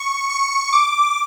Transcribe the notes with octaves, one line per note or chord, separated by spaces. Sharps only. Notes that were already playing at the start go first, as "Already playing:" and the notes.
Already playing: C#6
C#6
D6